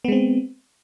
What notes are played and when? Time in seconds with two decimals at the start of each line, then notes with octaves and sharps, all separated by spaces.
0.05 B3
0.08 G#3
0.12 C4